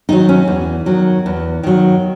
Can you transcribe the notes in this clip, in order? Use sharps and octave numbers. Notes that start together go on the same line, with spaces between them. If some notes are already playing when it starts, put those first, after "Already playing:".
D#3 F#3 D#4
C#4
E2
D#3 F#3
E2
D#3 F#3